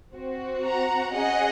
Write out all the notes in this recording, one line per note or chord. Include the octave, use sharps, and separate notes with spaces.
C4 F#4
F#5 A#5
C#4 G#4 D#5 F#5